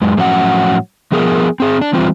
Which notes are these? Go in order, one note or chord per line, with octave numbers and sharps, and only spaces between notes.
F#2 G#3
A2 F3 F#3 C#4 E5 F#5
F3 B3 G#4 A#4
C4 G#4
D4
E3 G3 C4 F4 C5